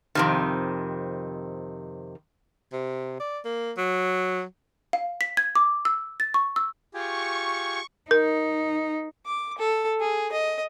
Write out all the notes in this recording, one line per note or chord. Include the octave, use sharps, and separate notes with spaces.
F2 C3 D#3
C3
D5
A#3
F#3
F5
B6
G#6
D6
E6
A6
C#6
E6
F4 G4 G#4 C#6
D#4 A#4
D6
A4
G#4
D#5